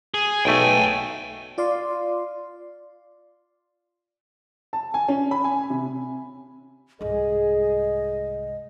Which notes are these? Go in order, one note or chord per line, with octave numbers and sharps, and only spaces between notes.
G#4
B1 A3 G5 G#5
F4 D5 F5 C6
A5
G#5
C#4
B5
G#5
C3
C2 G#2 G#4 D#5